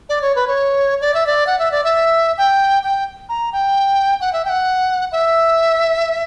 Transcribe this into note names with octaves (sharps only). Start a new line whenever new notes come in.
D5
C#5
B4
C#5
D5
E5
D5
F#5
E5
D5
E5
G5
G5
A#5
G5
F#5
E5
G5
F#5
E5